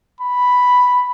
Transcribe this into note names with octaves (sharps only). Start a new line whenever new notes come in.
B5